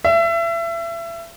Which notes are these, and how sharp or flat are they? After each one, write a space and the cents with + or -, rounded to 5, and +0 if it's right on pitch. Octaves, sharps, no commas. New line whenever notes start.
E5 +30